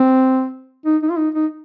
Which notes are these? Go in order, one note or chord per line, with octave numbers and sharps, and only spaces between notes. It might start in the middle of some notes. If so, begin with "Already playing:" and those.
Already playing: C4
D#4
D#4
F4
D#4
D#4